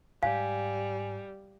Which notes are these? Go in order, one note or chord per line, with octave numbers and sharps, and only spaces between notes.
G#2 G3 F5 G#5